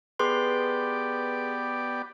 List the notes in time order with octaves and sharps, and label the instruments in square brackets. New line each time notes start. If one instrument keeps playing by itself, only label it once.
[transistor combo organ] B3 G4 D5 [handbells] G#4 B4 C6